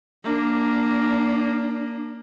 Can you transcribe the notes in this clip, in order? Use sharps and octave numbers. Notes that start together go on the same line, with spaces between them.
A#3 D4